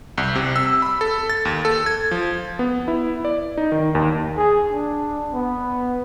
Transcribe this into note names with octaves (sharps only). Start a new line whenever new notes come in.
C2
C3
E6
B5
A4
A6
D#2
A4
G#6
F3
B3
E4
D5
D#4
D#3
D#2
G#4
D4
B3